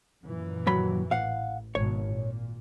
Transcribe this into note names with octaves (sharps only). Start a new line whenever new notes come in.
F#2 A#2 E3
D#2 F#3 B5
A1 F5 F#5
G#1 B2 C#5
A#2